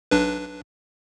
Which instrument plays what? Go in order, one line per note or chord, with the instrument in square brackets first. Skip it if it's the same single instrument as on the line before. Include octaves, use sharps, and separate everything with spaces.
[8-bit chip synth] B1 D4 B4